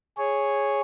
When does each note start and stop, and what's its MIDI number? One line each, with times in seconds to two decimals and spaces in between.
0.17 0.81 68
0.17 0.81 73